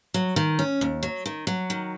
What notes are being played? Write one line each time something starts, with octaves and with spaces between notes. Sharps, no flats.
F#3
D#3
C#4
D#2
F#3
D#3
F#3
D#3